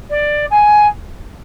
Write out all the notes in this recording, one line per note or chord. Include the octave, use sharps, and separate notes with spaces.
D5
G#5